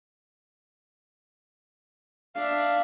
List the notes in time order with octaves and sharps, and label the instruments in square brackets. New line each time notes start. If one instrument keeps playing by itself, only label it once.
[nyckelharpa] D4 E5 [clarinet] F5